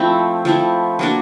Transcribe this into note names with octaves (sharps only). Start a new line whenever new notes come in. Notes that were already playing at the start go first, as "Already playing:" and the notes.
Already playing: F3 A3 C4 E4
F3 A3 C4 E4
F#3 A#3 D4 F#4